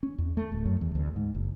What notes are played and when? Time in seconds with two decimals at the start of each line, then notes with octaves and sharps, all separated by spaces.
0.03 C#4
0.18 E2
0.37 A3
0.52 D1
0.66 F#2
0.81 E2
0.95 D2
1.16 G#2
1.34 F#1